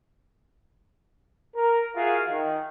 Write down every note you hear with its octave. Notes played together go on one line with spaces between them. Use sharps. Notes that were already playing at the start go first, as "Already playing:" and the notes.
A#4
F4 F#4 G#4 A#4 E5 F5
D#3